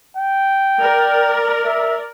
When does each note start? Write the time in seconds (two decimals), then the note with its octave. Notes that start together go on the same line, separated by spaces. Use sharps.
0.17 G5
0.81 A#4 D5
1.65 E5